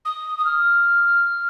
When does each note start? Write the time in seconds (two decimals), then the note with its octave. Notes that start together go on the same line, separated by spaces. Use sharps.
0.05 D#6
0.38 D#6
0.45 F6